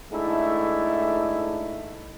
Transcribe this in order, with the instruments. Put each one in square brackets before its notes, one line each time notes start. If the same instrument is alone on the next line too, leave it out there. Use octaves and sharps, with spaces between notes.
[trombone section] G#2 A3 D4 E4